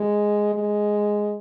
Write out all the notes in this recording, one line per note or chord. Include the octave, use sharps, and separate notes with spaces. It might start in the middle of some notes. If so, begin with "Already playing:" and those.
Already playing: G#3
G#3